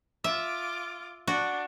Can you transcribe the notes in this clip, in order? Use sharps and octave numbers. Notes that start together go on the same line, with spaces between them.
F4 E5 D6
D4 F#4